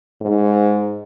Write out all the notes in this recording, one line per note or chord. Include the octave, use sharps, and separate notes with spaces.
G#2